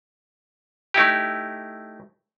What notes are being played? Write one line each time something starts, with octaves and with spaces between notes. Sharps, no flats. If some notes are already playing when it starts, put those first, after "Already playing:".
A3 D#4 E4 G4